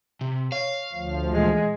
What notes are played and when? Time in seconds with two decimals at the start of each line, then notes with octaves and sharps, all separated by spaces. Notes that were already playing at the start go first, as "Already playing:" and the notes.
0.21 C3
0.52 C#5 F5
0.93 D2 F3
1.34 A#2 E3 G#3